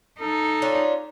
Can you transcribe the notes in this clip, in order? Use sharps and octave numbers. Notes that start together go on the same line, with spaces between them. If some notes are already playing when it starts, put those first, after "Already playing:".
D#4 A4
C#4 D4 F4